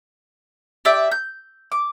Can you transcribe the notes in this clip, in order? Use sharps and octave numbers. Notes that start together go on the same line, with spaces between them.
G4 D5 E5
G6
D6